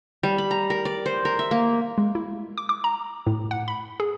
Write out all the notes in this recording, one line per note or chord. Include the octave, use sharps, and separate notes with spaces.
G3
B5
A#5
A#4
D5
C5
A#4
E5
A#3
G#3
E4
D6
D6
A#5
A2
F#5
B5
G#4